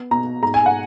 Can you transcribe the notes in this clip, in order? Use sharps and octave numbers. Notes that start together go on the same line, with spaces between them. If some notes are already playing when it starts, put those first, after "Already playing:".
Already playing: B3
B2 A#5
G#2 A#5
G#5
F#5